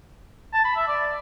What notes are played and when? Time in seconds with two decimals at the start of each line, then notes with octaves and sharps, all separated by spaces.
0.53 A5
0.65 B5
0.76 E5
0.88 D5